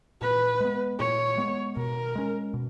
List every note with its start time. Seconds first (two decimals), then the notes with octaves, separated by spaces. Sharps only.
0.22 A#2 B4
0.60 G#3 B3
0.99 A#2 C#5
1.38 G#3 B3
1.77 B2 A#4
2.15 G#3 C#4
2.54 B2